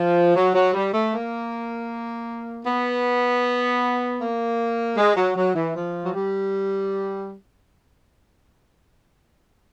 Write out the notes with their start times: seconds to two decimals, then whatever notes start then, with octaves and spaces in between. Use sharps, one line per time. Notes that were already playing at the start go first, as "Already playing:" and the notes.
Already playing: F3
0.36 F#3
0.55 F#3
0.74 G3
0.94 A3
1.13 A#3
2.66 B3
4.21 A#3
4.97 G#3
5.17 F#3
5.36 F#3
5.55 E3
5.75 F3
6.05 F#3
6.13 G3